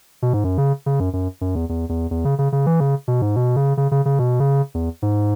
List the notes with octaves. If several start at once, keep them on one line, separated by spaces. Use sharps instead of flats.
B2
G#2
F#2
C#3
C#3
F#2
F#2
F#2
E2
E2
E2
E2
C#3
C#3
C#3
E3
C#3
B2
G#2
B2
C#3
C#3
C#3
C#3
B2
C#3
E2
G#2